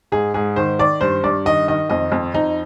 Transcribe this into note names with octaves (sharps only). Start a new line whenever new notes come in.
G#2 G#4
G#2 G#4
D#3 C5
D#3 D5
G2 C5
G2 D5
D#3 D#5
D#3 D#5
F2 D#5
F2
F2 D#4